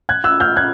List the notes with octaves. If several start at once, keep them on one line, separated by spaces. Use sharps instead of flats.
F#6 G#6
E6 F#6
F6 G6
F#6 G#6